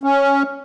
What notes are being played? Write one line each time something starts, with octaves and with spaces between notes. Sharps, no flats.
C#4